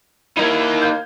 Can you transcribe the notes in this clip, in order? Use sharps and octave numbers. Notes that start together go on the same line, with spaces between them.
A#3 D#4 E4 G#6
F5 G6